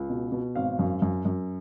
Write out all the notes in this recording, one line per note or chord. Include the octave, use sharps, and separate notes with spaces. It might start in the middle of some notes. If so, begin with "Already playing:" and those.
Already playing: C#2
B2
B2
G#1 F5
F#2
F#2
F#2